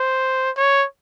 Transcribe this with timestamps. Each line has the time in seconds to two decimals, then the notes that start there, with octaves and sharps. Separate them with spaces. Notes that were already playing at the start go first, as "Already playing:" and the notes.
Already playing: C5
0.57 C#5